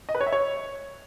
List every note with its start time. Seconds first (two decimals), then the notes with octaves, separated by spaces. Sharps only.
0.09 D#5
0.15 B4
0.21 C#5
0.27 E5
0.32 C#5